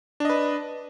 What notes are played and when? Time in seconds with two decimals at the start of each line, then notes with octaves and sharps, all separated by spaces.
0.20 D4
0.25 D#5
0.30 B4